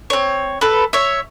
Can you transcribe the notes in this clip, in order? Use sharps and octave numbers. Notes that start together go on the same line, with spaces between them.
C4 C#5
A4 B4
C#5 E5